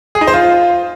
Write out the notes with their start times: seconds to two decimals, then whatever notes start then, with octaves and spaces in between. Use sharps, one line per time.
0.15 G#4
0.21 D#4
0.27 C5
0.34 F4